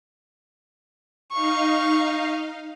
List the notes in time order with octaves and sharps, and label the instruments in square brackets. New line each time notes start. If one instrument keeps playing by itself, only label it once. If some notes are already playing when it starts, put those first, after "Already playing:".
[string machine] D#4 F5 [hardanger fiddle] C#6